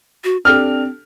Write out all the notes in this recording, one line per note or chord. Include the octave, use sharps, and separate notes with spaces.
F#4
C4 D4 G4 A4 F6